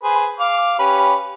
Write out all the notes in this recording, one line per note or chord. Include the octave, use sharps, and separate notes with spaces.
G#4 B4 C5
F5 D6
C#4 G4 B4